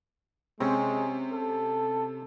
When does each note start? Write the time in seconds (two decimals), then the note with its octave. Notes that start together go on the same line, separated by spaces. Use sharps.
0.60 C3 G#3 C4 C#4
1.32 A4